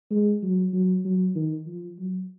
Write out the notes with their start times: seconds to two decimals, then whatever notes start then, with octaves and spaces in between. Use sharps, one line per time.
0.11 G#3
0.43 F#3
0.73 F#3
1.05 F#3
1.35 D#3
1.66 F3
1.99 F#3